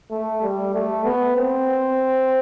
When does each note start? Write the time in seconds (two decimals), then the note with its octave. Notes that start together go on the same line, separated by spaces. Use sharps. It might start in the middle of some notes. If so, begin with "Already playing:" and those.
0.11 A3
0.42 G3
0.74 A3
1.05 B3
1.36 C4